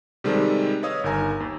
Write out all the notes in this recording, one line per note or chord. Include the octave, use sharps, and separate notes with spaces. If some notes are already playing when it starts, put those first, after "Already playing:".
C3 D#3 G3 G#3 C4 A4
B4 C#5 D#5 F5 D#6 E6
G1 D#3 A#4 G#5 A#5
D#2